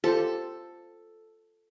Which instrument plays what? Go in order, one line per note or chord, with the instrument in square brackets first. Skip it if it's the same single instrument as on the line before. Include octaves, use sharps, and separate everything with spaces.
[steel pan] F4 G4 C5 [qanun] A4